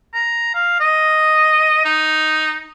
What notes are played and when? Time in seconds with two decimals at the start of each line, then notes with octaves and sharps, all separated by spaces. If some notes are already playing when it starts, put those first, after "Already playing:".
0.14 A#5
0.54 F5
0.80 D#5
1.85 D#4